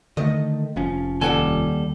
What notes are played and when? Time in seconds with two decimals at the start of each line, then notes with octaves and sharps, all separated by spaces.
0.17 D3 D#3 A3 D#5
0.76 F1 F3 C#4
1.21 D#2 G3 A4 F#5 G#5